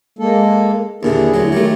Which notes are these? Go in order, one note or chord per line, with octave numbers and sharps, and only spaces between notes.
G#3 A#3 A4
D#2 A#2 D3 D4 E4 G#4
D2 F#3
D#3 F#3 G3 A3